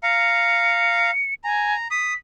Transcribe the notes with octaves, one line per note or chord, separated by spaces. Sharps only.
F5 A#5 C#7
G#5 A#5
D#6 B6